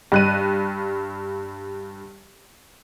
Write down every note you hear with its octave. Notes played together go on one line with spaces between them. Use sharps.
G2 F#6 D#7